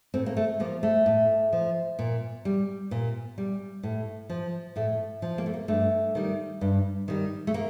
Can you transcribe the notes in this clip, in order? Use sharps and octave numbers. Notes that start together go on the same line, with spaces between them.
A2 C4
A#3
A3
F3 A#3
A3
A2
F3
A#2
G3
A#2
G3
A2
F3
A2 A3
F3
A#3
A3
A#3
G2 A3
D#3 G3
G2
D#3 G3
A3
A#3